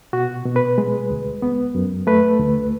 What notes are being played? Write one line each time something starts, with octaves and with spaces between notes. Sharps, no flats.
B2 F#4
B2
B4
G#3
D2
B3
F#2
A3 B4
D2